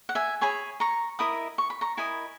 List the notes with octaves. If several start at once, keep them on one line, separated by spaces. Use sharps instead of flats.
F#5
E5 G#5
G#4 C#5 G#5 B5
A#5 C#6
E4 A#4 D#5 B5 D#6
C#6
B5
A#5 C#6
E4 A#4 D#5 G#5 B5